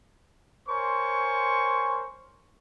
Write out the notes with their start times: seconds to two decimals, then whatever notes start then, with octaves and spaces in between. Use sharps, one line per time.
0.68 A#4 C5 C#5 G#5 C6 C#6